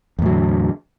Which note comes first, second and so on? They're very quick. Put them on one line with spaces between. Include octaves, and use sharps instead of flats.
E2 A2 F#3 D3